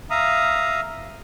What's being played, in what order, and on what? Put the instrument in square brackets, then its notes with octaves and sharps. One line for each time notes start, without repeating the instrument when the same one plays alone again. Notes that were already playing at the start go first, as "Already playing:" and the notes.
[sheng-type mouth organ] E5 F5 A#5 D#6